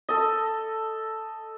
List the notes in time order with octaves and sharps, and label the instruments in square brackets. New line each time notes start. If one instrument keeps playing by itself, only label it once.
[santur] A4 D#5